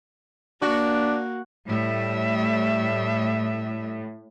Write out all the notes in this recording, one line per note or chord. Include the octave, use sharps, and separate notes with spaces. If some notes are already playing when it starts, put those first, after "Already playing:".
A#3 D4 F#4
A2 G3 E5